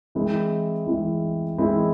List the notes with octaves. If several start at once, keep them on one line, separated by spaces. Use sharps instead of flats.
E3 G#3 C4 E4
E3 G#3 C4 E4
E3 G#3 C4 E4